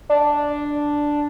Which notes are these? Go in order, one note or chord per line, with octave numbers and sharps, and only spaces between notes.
D4